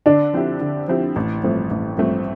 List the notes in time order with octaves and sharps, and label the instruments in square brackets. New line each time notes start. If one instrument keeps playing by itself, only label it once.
[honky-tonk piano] D3 [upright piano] D4
[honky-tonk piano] F3 C4 E4 G4
D3
F3 C4 E4 G4
A1
G2 F3 A3 C4
A1
G2 F3 A3 C4